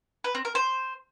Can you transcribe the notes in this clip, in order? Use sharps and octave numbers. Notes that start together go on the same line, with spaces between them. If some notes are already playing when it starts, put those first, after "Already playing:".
B4
C4
A#4
C5